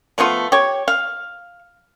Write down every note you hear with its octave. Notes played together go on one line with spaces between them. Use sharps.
F3 A3 B3 F4
G4 C#5
F5